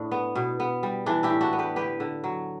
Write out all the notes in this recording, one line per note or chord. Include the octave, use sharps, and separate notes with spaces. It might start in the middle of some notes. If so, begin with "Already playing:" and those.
Already playing: A2 D4
B3
B2
B3
G3
E3 D4
E4 G4
A2
D4 F#4
B3
G4 B4
D3 G4 B4
D3
F#3